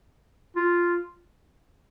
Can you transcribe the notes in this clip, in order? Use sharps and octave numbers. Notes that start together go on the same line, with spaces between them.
F4